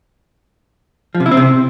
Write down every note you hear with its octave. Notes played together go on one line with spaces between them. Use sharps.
F3
C3
E4
C4
C3